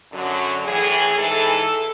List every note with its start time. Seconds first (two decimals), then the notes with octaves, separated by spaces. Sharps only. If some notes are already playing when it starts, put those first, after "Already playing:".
0.11 F#2 D3 F#3
0.64 A2 E3 G#4
1.17 G#2 E3 A4